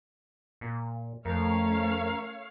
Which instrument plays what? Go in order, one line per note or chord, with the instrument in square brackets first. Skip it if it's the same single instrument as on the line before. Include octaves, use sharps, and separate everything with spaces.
[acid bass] A#2
[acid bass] F2 [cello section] A3 C#4 [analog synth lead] A#4 [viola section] C#5 F5